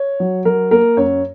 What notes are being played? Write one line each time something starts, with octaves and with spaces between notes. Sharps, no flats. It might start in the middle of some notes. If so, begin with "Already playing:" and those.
Already playing: C#5
F#3
F#3 A#4
A#3 A#4
F#2 C#5